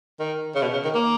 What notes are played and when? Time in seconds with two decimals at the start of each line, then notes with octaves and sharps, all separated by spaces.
0.20 D#3
0.55 C#3
0.62 B2
0.73 C#3
0.85 D#3
0.95 A#3